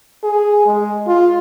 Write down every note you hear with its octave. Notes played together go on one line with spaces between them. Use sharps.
G#4
G#3
F4